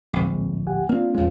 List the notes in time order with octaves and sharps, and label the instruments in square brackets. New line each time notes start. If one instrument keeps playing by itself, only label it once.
[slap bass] D1 A#1 [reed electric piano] G#3 C4
[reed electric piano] G4 F#5 G#5
[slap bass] A#3 C4 [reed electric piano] D4 F4
[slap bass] E2 G#3 [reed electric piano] A2 C#4 F4